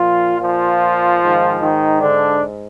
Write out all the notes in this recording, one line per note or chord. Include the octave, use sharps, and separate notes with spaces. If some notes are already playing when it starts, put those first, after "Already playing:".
Already playing: A#2 F3 F4
F3 F4
G#2 D#3
D#3 D#4
D3 D4